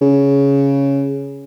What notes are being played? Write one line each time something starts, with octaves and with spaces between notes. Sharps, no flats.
C#3